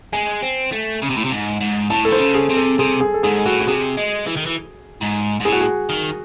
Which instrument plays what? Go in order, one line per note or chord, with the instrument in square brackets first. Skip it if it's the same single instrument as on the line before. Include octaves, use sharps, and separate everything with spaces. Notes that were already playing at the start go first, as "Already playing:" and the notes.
[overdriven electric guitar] G#3 [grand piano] G#5
[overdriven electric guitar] C4
A3
C#3
C3
A2
C3
G#2
G#2
[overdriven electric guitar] A2 [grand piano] A5
[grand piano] A4
[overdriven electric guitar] D#3 [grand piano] C5
[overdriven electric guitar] C#3
[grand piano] G#4
[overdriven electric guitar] C3
[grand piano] A4
[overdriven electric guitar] C3 [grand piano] G#4
[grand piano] G#4
A4
[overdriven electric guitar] G#2 [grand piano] G#4
[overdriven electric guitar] A2 [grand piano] F#4
[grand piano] F#4
[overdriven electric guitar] C3 [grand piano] G#4
[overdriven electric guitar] G#3
E3
D#3
E3
G#2
G#2
[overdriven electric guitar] A2 [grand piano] G#4
[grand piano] F#4
G#4
[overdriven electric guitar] D#3